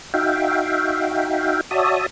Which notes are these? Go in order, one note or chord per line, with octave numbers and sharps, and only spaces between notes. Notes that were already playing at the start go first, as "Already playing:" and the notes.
D#4 F#4 E5 F5 G5
F#4 C#5 D5 E5 A5 D#6